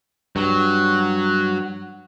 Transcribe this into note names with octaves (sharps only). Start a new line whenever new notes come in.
G2 F#3